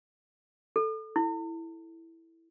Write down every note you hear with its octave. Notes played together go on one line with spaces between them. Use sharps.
A4
E4